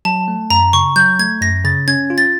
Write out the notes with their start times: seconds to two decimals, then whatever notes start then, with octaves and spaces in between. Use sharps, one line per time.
0.05 F#3 A5
0.28 A3
0.50 F#2 A#5
0.73 C#3 C#6
0.96 F#3 G6
1.19 A3 G#6
1.42 F#2 A#6
1.65 C#3 A6
1.88 C#4 G#6
2.10 F4
2.18 A6